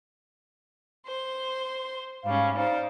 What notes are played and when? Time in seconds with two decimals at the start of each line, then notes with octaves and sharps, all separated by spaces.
1.06 C5 C6
2.24 G#2 G3 C#4 F5
2.57 D#4 C5 D5 F5